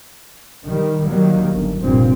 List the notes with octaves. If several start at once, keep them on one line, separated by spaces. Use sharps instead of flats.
D#3 G3
D#3 F#3 G3 A#3
G1
F1 G2 A#2 C4